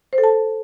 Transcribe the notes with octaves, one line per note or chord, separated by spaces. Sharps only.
C5
A4
A5